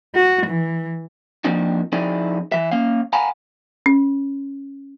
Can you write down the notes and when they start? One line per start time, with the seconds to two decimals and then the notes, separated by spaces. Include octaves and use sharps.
0.15 F#4
0.47 E3
1.45 F3 A#3 C4 D4 D#4
1.92 F2 C4 D#4 E4 G#4 D5
2.52 E3 E5
2.71 A#3 C#4 F5
3.13 F5 F#5 G#5 A#5 B5
3.86 C#4